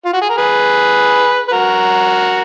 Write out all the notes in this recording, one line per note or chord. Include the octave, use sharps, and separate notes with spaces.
F4
F#4
G#4
A#4
G#4 B4
B4
F#4 A#4